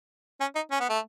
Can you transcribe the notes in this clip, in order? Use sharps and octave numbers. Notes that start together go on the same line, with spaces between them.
C#4
D#4
C#4
B3
A3